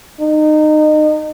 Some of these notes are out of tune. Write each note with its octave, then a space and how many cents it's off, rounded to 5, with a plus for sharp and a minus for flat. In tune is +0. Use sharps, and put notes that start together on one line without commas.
D#4 -25